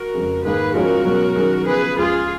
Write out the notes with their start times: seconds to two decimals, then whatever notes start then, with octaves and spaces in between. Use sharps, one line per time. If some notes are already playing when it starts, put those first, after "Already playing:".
Already playing: F#4 A#4
0.14 F2 C#3 G#3
0.44 G#2 D#3 A#3 G#4 B4
0.74 F3 G#3 C#4 F#4 A#4
1.04 B2 F#3 C#4
1.35 D#3 F#3 C#4 G#4
1.66 C#3 F3 B3 G#4 B4
1.96 C#2 C#3 F3 F4 G#4